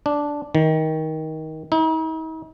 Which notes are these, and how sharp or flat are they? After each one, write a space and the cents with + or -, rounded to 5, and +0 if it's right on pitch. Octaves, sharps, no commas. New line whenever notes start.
D4 -5
D#3 +20
D#4 +45